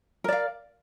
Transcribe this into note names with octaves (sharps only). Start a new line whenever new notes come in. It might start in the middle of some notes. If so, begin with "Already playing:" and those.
A#4 D5 F5